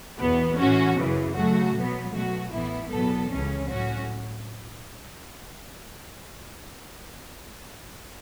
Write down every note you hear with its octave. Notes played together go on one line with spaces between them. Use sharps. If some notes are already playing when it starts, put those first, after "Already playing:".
E2 B2 B3
A2 E3 C#4 F#4
F#2 C#3 E3
C#3 F#3 A3 F#4
B2 F#3 B3
B2 F#3 A3 F#4
A1 A2 E3 B3 E4
E2 B2 F#3 B3 A4
C#2 C#3 E3 C#4
A2 F#3 C#4 F#4